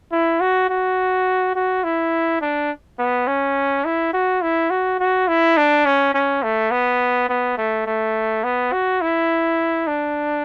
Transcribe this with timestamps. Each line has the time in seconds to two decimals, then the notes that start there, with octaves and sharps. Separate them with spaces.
0.12 E4
0.41 F#4
0.70 F#4
1.55 F#4
1.84 E4
2.41 D4
2.99 B3
3.27 C#4
3.85 E4
4.13 F#4
4.42 E4
4.70 F#4
5.00 F#4
5.28 E4
5.57 D4
5.86 C#4
6.14 C#4
6.43 A3
6.71 B3
7.29 B3
7.57 A3
7.86 A3
8.44 B3
8.72 F#4
9.01 E4
9.87 D4